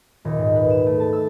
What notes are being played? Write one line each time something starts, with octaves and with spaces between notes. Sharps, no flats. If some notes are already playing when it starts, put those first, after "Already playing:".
D#1
G#2
B4
E7
A3
A5
E6